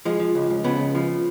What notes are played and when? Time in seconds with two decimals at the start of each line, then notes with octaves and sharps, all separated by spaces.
0.05 F3 G#3
0.20 F3
0.35 C#2
0.50 C#2
0.64 C#3 B3
0.80 C#2
0.95 F3